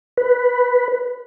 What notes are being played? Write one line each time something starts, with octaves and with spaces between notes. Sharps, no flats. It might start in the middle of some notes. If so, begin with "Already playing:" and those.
B4